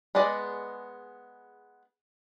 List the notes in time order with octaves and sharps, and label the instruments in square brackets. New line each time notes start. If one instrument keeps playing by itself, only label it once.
[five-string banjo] G#3 B3 G#4 D5 D#5